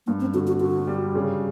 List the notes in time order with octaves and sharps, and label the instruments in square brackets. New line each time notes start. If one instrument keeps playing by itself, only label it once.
[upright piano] G2 [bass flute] A#3
[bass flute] C4
[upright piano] D3 [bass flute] F#4
[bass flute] F#4
[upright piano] D3 [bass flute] F#4
[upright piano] G3
C#3